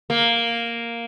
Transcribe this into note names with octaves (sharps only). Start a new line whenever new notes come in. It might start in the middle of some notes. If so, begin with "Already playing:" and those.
A#3